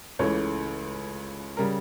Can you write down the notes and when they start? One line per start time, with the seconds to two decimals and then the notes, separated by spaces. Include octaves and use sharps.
0.19 C#2 C#3 E3 A3 C#5
1.57 C#3 G3 A#4